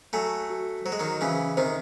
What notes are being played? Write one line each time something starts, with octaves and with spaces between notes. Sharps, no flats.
F#3 A3 G#5
F#4
F#3 C5
G#3
D#3 F#3
C#3 E3 G#5
C3 D#3 C5